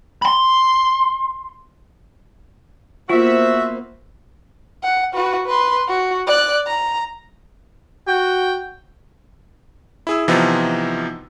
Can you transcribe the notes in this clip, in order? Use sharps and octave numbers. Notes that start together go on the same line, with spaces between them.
B5 C6
A#3 B3 F4 F#4 C5 E5
F#5
F#4 B4
B4 C6
F#4
D5 F#6
A#5
F#4 G5
E4 G#4 E6
C3 E3 F3 B3 D#4 F4